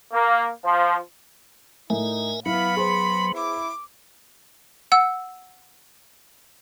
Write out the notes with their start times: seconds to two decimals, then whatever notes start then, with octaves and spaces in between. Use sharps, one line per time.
0.13 A#3
0.64 F3
1.90 A2 D#4 A#4 E5 G#5
2.46 F#3 B3 E4 F5 B5
2.77 G#4 C5 C6
3.34 E4 D6
4.92 F#5 E6